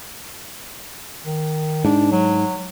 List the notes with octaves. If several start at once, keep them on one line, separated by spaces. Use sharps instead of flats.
D#3
G#2 D4
F#3